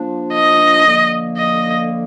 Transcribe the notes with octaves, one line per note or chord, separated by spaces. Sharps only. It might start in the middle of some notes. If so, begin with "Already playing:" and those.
Already playing: F3 A#3 D4
D#5
D3 F3 A#3
D#5